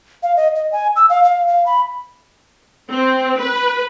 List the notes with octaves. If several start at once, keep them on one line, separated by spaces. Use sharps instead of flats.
F5
D#5
D#5
G#5
E6
F5
F5
F5
B5
C4
B4